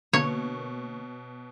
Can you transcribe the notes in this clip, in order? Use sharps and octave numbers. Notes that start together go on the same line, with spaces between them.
B2 D3 A#3 C#5 C#6